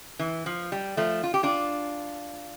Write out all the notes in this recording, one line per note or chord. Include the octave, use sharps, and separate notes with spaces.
E3
F3
G3
F3 A3
F4
G4
D4 F4